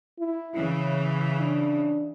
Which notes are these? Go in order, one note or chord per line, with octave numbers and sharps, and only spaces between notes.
E4
C#3 E3 C#4
D4